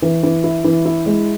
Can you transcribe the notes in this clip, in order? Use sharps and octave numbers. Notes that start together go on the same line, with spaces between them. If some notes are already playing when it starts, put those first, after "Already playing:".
E3
E3
E4
E3
E4
G#3